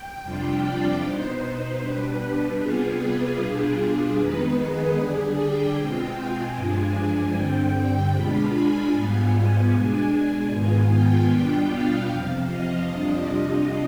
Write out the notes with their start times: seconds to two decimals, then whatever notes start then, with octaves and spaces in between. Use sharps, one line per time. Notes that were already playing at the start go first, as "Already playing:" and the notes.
Already playing: G5
0.22 F2 C3 G3 D4 F4
0.62 D5
1.01 B2 B3 D#4 C5
1.80 B2 G3 D4 B4
2.59 C3 G3 B3 F4 G#4
2.99 B4
3.38 B2 G3 D4 F4 G#4
4.18 F2 D#3 G#3 B3 D#4 B4
4.57 G#4
4.96 D3 G3 D4 G#4
5.36 G5
5.75 B2 G#3 C4 F4 G5
6.15 G#5
6.55 G2 F3 G#3 D4 G#5
7.34 G2 D3 G3 C4 G5
8.13 B2 G#3 D4 F4 B5
8.52 G#5
8.92 G#2 G3 B3 F4 G#5
9.71 B2 G#3 D4
10.11 G#5
10.50 G#2 D#3 B3 F4
10.90 G5
11.29 B2 G3 B3 D4 F4
11.69 F5
12.09 F2 C3 F3 C4
12.48 D#5
12.87 F2 C3 G3 D4 F4